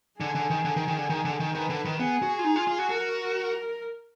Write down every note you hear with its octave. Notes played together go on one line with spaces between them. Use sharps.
D3 G#4
D3
D#3
D3
D#3
D#3
D3
D#3
D3
D#3
D#3 B4
D3
D#3
B3 G#4
F#4
F4
D#4
F4
F4
F#4
F#4 A#4